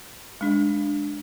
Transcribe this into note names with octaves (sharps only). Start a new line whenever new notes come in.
G#3 D4